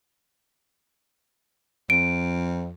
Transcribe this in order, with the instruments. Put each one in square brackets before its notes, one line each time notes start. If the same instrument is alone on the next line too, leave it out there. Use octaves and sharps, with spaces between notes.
[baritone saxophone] F2 [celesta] D7